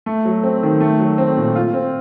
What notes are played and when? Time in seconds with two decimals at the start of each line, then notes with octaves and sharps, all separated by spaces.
0.06 A3
0.25 F#3
0.43 C4
0.63 D#3
0.81 A3
0.99 F#3
1.18 C4
1.37 A#2
1.56 F4
1.74 C4